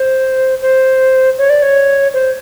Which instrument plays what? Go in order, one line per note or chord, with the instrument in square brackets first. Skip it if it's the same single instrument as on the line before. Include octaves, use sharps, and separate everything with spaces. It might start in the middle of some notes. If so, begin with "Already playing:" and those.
Already playing: [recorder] C5
C5
C#5
D5
C#5
C5